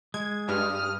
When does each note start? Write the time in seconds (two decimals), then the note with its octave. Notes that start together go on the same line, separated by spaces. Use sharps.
0.14 G#3 G#6
0.49 G2 D#6 F6